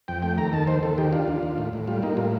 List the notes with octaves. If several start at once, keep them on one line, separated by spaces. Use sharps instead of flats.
F2 G5
A3 G5
D#2 A#5
D#3 A5
D#2 C5
D#2 A4
D#3 G4
D4 F4
D#2
D#2
A2
A2
G3 F4
A#3 D#4
A2 F4